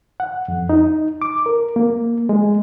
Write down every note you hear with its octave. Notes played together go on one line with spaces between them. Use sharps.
F#5
F2
D#4
D6
A#4
A#3
G#3